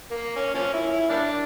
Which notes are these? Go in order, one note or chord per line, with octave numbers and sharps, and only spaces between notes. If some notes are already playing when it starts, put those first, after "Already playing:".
A#3
C#4
F3 A#3 C#4
E4
E4
G3 A#3 D4